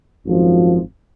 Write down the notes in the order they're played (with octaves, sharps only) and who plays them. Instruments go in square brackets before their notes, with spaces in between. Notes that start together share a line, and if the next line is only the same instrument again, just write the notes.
[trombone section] G#1 F#2 F3